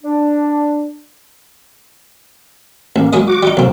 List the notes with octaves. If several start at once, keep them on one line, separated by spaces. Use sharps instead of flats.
D4
A1 A#3
F#3 G#3 D#5
F#4 D6
G3 D#4
B1 C3 F#3 A#3 C4